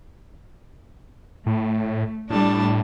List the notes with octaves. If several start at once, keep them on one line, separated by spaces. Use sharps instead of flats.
A2 A3
A2 G3 D4 A5